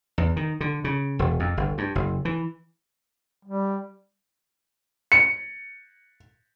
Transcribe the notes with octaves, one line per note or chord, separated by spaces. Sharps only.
E2
D#3
D3
C#3
E1
F2
G1
G2
F#1
E3
G3
C#7